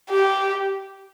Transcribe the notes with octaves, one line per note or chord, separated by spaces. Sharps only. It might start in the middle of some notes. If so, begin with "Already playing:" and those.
G4